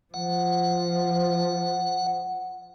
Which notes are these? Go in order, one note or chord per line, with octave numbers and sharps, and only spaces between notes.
F3 F#5